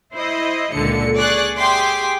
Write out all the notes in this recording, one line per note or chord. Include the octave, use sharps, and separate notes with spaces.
E4 C5 D#5
C#2 A#2 D3 C#7
G#4 D5 C#6 F#6
G4 G#4 E5 G5 C6 D6